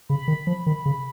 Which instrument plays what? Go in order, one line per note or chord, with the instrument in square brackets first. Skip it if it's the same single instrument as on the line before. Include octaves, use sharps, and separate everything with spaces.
[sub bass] C#3 [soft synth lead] B5
[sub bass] D#3
F3
D#3
C#3